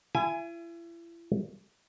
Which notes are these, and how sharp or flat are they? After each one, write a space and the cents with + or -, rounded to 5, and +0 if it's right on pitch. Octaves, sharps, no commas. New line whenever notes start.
E4 +40 G#5 +0